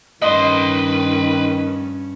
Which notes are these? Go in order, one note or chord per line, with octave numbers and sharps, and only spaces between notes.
G2 D#3 C#4 B4 D#5 C6